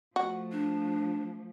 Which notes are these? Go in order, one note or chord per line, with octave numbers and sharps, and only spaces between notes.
F3 A3 F#4
D4